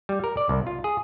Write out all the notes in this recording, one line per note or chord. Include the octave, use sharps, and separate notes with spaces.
G3
A#4
D5
C2
F4
G#4